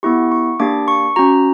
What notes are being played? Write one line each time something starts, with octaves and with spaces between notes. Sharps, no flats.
B3 E4 G4 C#6
C#6
A#3 D4 G4 D6
C#6
C#4 F#4 A#5